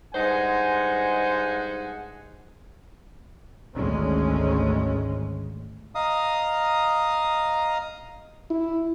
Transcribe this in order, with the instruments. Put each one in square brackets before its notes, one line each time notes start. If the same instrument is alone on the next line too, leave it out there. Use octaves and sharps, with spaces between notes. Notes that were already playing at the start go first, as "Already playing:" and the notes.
[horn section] G2 G#3 D#4 C5 F#5 G#5
[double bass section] G#1 D2 G#3 C#4
[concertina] D#5 F5 A#5 D#6
[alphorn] E4